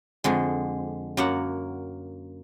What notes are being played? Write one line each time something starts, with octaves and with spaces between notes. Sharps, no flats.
F2 D3 G#3
F#2 A#3 F#5